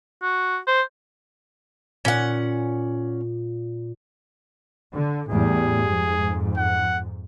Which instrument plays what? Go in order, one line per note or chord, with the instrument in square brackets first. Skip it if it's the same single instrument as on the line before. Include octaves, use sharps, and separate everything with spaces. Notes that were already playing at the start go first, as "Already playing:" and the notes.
[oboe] F#4
C5
[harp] A#2 [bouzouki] C#4 F#5
[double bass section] D3
[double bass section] E2 A2 G3 [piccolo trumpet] G#4
[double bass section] F2 G#2
[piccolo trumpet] F#5